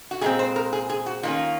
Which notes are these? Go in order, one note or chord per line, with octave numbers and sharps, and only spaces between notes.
F#4
A#2 G#3 C4 G#4
C5
A#4
G#4
G#4
F#4
D#3 A#3 C#4 F4